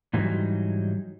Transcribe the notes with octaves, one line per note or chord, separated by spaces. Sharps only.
G#2 E3 F#3 G3 D#4